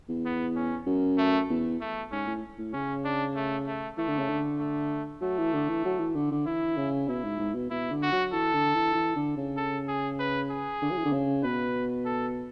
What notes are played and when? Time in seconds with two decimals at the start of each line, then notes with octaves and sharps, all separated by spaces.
0.09 E2
0.25 B3
0.56 C#4
0.86 F#2
1.18 A3
1.49 E2
1.81 A3
2.12 G#2 C#4
2.27 A2
2.58 A2
2.73 C#3 C#4
3.05 D4
3.35 A3
3.66 A3
3.97 E3 A3
4.08 D3
4.19 C#3
4.29 D3
4.59 A3
5.22 F#3 A3
5.38 E3
5.53 D3
5.68 E3
5.85 F#3
5.99 E3
6.15 D3
6.31 D3
6.46 E3 E4
6.77 C#3
7.08 B2 E4
7.24 G#2
7.39 G#2
7.55 B2
7.70 B2 E4
7.91 D3
8.02 F#4
8.12 F#3
8.33 E3 A4
8.53 D3
8.75 E3
8.94 E3
9.16 D3
9.37 C#3
9.57 A4
9.88 G#4
10.19 B4
10.50 G#4
10.82 D3
10.91 F#3
10.97 E3
11.05 D3
11.12 C#3
11.43 B2 B4
12.05 A4